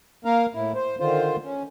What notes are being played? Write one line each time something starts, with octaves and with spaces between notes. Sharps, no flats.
A#3 A#4 F5
A2 E4
C5
D3 D#3 F4 C5
C#4